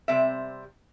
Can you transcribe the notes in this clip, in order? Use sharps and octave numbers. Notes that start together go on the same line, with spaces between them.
C3 G3 C4 E5